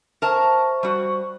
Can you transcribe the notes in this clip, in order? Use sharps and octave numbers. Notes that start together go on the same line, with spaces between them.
A#4 C5 E5 A5 C#6
G3 F#4